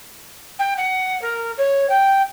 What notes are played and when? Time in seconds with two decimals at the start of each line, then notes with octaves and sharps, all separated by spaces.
0.59 G5
0.77 F#5
1.22 A#4
1.58 C#5
1.89 G5